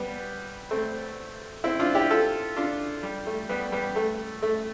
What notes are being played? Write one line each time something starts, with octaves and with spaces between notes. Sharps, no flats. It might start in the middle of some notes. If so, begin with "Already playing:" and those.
Already playing: G3 B3
A3 C4
C4 E4
D4 F4
E4 G4
F4 A4
D4 F4
G3
A3
G3 B3
G3 B3
A3
A3